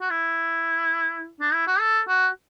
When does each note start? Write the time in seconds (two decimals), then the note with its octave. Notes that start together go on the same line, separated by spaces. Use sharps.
0.01 F#4
0.10 E4
1.41 D4
1.53 E4
1.67 F#4
1.80 A4
2.08 F#4